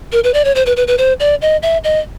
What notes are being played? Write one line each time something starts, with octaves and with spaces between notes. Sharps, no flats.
A#4
B4
D5
C#5
C5
B4
B4
B4
C5
D5
D#5
E5
D#5